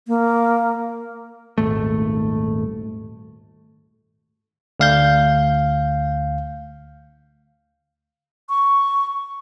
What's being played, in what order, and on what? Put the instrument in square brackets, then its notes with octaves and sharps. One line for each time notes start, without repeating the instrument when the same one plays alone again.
[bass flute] A#3
[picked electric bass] D#1 G#1 A3
[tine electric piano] D2 F5 G6
[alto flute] C#6